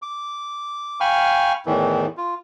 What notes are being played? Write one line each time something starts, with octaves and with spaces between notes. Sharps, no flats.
D6
F5 G5 G#5 B5 C#6 F6
E2 A2 D#3 E3
F4